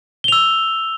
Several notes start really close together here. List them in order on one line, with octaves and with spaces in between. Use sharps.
G7 F7 E6